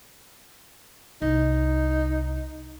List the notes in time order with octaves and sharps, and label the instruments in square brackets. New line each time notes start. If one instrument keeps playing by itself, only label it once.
[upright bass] C2 [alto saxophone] D#4